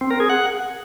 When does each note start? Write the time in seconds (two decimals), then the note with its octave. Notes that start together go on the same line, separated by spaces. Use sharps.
0.01 C4
0.11 A#4
0.20 G#4
0.30 F#5